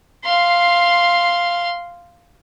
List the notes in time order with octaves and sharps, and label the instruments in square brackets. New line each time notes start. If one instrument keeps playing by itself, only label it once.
[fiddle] F5 C6